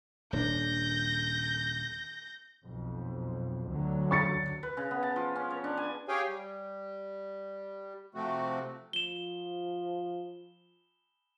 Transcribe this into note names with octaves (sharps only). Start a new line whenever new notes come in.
D#1 C#4 D4 G6 A#6
B1 F2
D2 D3 F#3
C#6 A6 C#7
B4
C#3
B3
A5
F3
C#4
C#5
D4
G#5
G4 G#4 C#5 F5 G5 G#5
G3
C3 F3 A3 C4 F#4
F3 E7 G7